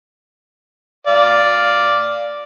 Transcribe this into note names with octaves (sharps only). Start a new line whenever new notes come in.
D5 F5